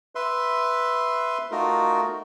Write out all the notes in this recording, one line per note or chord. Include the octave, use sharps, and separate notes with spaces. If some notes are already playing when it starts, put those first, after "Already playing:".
B4 E5 C6
A3 D#4 F4 F#4 A#4